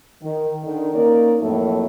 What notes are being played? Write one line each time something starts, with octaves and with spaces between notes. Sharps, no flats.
D#3
D3 D#3
A#3 C#4 D#4 A#4 D5
F2 A2 F#3 A3 A#3